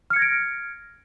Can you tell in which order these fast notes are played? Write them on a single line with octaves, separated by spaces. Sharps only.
F6 C#7 G#6 A#6 D7